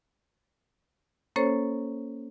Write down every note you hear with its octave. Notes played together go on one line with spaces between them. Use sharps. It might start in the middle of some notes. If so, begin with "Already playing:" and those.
A#3 C#4 A4 C5 C#5